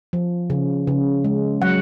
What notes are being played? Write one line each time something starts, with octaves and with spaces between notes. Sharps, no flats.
F3
C#3
C#3
G#3
F#3 F#5